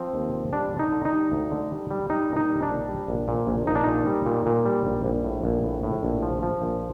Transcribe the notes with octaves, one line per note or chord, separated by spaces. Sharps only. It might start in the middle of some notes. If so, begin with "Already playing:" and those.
Already playing: F3 C4
D#2
F3
G3 D4
D3
D#4
D3
D#4
G3
D2
D3
G3
G3
G3 D#4
A#2
D#4
G3
D4
A#1
G3
A#1
A#2
A#1
A#1 D#4
D4
A#2 D#4
G3
A#2
A#2
G3
A#1
A#1
A2
A#1
A2
A2
A#1
F3
F3
A#1